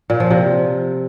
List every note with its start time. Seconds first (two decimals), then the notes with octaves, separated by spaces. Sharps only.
0.10 A#2
0.20 F3
0.30 C3